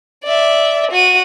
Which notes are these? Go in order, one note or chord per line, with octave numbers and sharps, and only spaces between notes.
D5 E5
F#4 D#7